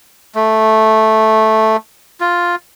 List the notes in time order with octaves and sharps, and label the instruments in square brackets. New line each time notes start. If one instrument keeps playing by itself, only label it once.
[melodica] A3
F4